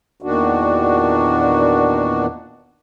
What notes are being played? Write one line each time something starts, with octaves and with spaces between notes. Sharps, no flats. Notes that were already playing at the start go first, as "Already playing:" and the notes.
E2 A#2 D#3 D4 F#4